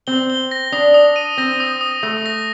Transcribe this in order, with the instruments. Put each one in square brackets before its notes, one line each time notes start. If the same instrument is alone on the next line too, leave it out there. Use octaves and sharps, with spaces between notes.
[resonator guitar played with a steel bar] C4 [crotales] G7
[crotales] G7
A#6
[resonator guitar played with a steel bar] D4 [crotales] D#6
[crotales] D#6
D#7
[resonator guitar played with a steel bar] C4 [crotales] A#6
[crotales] D#6
D#6
[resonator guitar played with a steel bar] A3 [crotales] D#6
[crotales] A#6